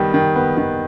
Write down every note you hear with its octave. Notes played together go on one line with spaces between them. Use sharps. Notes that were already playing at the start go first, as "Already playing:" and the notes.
Already playing: D#3 G3 B3
D#3
B3
D#3